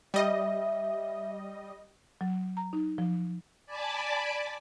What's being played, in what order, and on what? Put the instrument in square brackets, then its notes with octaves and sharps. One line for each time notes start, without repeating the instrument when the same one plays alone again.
[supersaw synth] G3 D#5 [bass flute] E5
[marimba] F#3
A#5
D#4
F3
[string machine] D5 G#5 A5 B5 D6